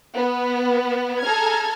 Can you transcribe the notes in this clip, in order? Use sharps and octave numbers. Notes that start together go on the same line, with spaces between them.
B3
G#4 A4 A#5 F6 G#6